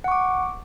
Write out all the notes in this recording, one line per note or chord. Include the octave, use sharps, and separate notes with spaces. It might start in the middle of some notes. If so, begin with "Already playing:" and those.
F#5 C#6 D6